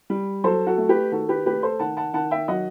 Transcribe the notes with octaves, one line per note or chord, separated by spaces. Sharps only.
G3
F#3 A4 C5
F#4 A4
A3
G4 B4
D#3 F#4 A4
G4 B4
A3 G4 B4
A4 C5
D#3 F#5 A5
F#5 A5
D#3 F#5 A5
E5 G5
F#3 D#5 F#5